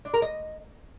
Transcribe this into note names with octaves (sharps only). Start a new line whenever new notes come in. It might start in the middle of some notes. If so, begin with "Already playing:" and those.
D4
A#4
D#5